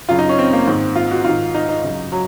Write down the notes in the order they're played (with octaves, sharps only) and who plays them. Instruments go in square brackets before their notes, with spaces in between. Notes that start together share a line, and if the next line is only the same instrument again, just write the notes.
[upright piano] F#2 C#3 F4
D#4
C#4
C4
A#3
G#2 D#3 C4
F4
F#4
G#2 D#3 F4
D#4
D#4
F#2 C#3
F#3